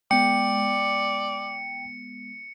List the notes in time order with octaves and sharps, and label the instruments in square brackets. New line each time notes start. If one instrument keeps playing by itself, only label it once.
[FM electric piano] G#3 B3 [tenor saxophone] D5 [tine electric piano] G5 [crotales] C#7